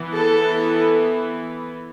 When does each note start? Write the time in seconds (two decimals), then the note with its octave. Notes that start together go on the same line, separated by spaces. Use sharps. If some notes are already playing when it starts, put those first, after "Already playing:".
Already playing: E3 B3
0.14 A4